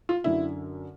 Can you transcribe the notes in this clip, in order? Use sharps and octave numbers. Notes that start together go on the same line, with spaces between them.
F4
F#2 D3 E4